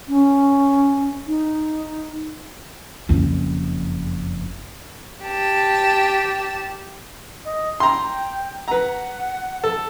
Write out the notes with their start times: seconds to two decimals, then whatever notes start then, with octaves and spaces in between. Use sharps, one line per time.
0.08 C#4
1.27 D#4
3.09 F#1 F2
5.24 G4 A5
7.45 D#5
7.80 G5 A#5 C6
8.68 B4 F#5 A#5
9.64 A4